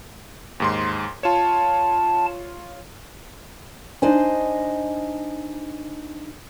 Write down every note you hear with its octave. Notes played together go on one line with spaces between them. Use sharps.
D#2 G#2 C6
F4 C#5 A5
D4 D#4 C5 D#5 G#5